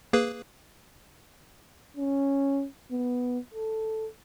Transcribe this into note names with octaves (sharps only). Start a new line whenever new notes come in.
A#3 G#4 B4
C#4
B3
A4